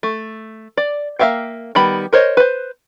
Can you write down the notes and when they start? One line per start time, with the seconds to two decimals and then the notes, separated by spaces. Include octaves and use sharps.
0.03 A3
0.77 D5
1.19 A#3 C5 E5 F5 G5
1.75 D#3 G3 B3 B5
2.13 A#4 C5 C#5 D#5
2.37 B4 C5